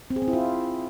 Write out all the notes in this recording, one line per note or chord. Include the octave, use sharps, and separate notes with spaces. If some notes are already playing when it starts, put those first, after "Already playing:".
C4
G#4
C4
E4
F4